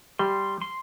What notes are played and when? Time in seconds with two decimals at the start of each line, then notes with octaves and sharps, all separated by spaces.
0.19 G3 C6
0.62 C6